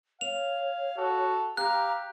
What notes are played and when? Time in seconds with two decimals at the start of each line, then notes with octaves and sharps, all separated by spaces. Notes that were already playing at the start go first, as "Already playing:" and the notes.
0.21 C#5 F5 F7
0.98 F#4 A4
1.57 G4 F5 A#5 F#6